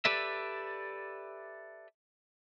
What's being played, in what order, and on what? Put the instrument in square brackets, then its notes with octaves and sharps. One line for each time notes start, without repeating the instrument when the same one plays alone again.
[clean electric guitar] G4 A4 B4 D5 E5